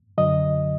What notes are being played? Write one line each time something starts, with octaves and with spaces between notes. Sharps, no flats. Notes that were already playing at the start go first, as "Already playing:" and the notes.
F#2 D3 F#3 D#5